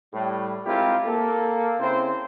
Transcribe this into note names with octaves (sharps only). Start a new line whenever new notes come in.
A2 G3
G#3 C4 E4 F4 G4 A#4
A#3 A4
C#3 C4 E4 C5